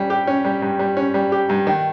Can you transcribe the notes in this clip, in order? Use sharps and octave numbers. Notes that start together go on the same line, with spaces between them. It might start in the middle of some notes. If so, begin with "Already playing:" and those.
Already playing: G3 C#4
G4
C#4
G3
G2
G3
C#4
G3
G4
G2
D#3